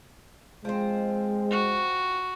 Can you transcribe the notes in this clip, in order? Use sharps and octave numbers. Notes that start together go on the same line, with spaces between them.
F3 G#3 C4
F#4